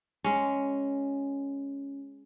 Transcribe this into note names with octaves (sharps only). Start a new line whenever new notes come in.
G#3 C#4